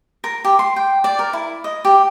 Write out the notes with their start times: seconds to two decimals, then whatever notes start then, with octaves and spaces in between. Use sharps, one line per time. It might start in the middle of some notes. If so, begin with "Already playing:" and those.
0.24 A#4
0.44 G4
0.59 C6
0.76 G5
1.04 D5
1.19 A#4
1.33 E4
1.64 D#5
1.85 G4